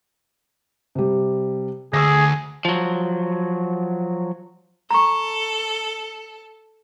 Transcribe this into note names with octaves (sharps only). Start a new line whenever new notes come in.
C3 G3
D2 G#4 E6 A#6
F3 F#3
A4 A#5 C#6